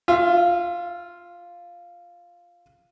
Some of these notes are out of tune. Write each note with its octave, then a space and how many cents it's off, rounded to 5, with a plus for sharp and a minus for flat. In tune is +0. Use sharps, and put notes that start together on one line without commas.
F4 +0 E5 +35